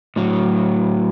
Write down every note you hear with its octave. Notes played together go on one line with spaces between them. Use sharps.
A2 F#3